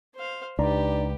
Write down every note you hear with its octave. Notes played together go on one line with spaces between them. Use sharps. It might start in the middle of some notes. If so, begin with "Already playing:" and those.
C5 F5
C#2 D4 D#4 G4 B4 D5 A#5